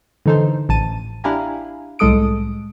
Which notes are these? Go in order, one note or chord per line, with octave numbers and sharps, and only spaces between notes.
D3 E3 D#4 A4 C5
A1 A5 D#7
D4 E4 G4 F5 G#5 A#5
C2 A2 G#3 A4 D#6 D7